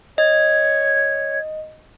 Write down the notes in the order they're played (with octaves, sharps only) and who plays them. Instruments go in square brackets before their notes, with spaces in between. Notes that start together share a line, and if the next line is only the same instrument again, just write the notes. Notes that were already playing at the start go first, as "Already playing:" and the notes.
[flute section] C#5 G#6 [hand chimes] D#5